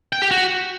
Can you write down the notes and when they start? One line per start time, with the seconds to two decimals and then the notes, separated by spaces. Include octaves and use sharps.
0.13 G5
0.22 G4
0.31 F#4